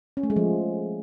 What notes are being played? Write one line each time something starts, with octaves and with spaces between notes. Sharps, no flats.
C#4
A3
G#3
F3